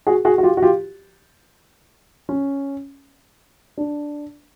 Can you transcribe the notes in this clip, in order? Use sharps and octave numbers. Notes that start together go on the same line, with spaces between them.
F#4 G#4
F#4 G#4
F#4
F4 G4
F#4
F4 G4
C#4
D4